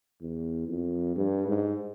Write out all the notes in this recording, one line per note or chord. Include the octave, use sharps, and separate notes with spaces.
E2
F2
G2
G#2